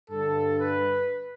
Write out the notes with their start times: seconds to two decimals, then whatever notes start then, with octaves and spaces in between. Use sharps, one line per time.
0.11 G2 D3 A4
0.58 B4